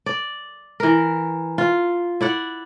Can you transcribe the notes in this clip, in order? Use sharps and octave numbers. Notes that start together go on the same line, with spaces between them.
D5
E3 A#4
F4
E4 D5 F#5